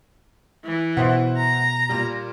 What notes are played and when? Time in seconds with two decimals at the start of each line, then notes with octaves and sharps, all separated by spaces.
0.65 E3
0.97 B2 E4 C5 F#5
1.37 A#5
1.89 A#2 G3